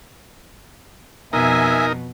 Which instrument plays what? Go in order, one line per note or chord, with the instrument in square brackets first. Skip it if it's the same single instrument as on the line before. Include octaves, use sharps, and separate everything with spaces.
[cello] F2 B2 [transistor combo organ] D#4 A#4 [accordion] E5 G#5